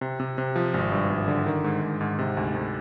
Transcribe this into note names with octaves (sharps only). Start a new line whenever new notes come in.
C3
C3
C3
F3
G#1
G2
G#1
D3
D#3
G#2
G#2
G#2
C3
D2
D2